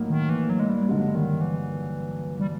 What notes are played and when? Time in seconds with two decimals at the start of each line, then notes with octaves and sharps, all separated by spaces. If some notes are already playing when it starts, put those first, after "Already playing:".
Already playing: A2 F#3 A#3 D#4
0.10 D#3
0.29 E3
0.50 F#3
0.60 G#3
0.69 G3
0.89 G2 D3 F#3 G#3
1.15 D#3
1.41 E3
2.40 G3